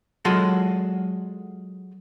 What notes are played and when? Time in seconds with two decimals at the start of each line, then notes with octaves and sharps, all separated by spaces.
0.25 F#3 G#3 F4 F#4 A4